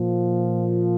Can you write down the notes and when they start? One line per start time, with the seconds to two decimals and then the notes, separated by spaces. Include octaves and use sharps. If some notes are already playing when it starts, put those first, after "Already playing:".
Already playing: A#2 F3